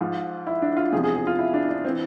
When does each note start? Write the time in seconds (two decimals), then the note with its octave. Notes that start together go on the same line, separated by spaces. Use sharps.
0.01 G#2 F3 F4
0.47 E4
0.62 D4
0.77 F4
0.92 E2 C3 F3 G#4
1.04 G#4
1.15 G#4
1.27 F4
1.39 E4
1.54 D4
1.69 D4
1.85 C4
1.88 E3